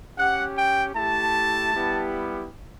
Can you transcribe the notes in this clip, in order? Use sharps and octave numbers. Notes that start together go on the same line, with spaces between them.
C#4 G4 F#5
G5
A3 E4 G4 A5
G3 B3 E4 G4